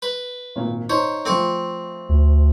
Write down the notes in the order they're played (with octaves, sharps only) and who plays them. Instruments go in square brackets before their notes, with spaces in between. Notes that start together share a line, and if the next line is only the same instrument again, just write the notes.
[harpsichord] B4
[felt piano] G#1 A#2
[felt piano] D#4 [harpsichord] C5 C#5
[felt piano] F3 A3 [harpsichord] C4 G#5 C#6
[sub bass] D2